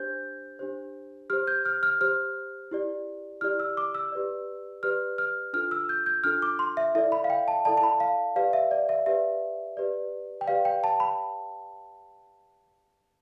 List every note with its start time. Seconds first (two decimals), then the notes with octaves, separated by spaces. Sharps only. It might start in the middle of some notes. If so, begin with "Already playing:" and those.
Already playing: D4 G4 C5 G6
0.59 D4 G4 C5
1.30 G4 C5 F6
1.47 G6
1.65 F6
1.83 F6
2.01 G4 C5 F6
2.71 E4 G4 D5
3.41 E4 G4 D5 F6
3.60 E6
3.77 D6
3.95 E6
4.12 G4 B4 D5
4.83 G4 B4 D5 F6
5.18 F6
5.53 D4 F4 A4 F6
5.71 E6
5.89 G6
6.06 G6
6.24 D4 F4 A4 F6
6.42 D6
6.59 C6
6.77 E5
6.95 E4 A4 D5 E5
7.12 B5
7.24 F5
7.30 G5
7.48 A5
7.65 E4 A4 D5 A5
7.77 A5
7.83 B5
8.00 F5
8.36 G4 B4 D5 F5
8.53 E5
8.71 D5
8.89 E5
9.06 G4 B4 D5 E5
9.77 G4 B4 D5
10.41 G5
10.47 G4 B4 D5 F5
10.65 G5
10.84 A5
11.00 B5